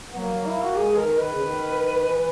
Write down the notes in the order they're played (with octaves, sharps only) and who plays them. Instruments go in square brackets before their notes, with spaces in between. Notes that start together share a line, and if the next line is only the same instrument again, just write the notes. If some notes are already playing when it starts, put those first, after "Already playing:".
[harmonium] B3
[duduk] F#3 [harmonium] A#3
[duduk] F#3
E4
F#4
[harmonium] F#3
[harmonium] G#3 [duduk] G#4
[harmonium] E3
[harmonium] D#3 [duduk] A#4
[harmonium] D#3 [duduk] B4
[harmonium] C#3
D#3
E3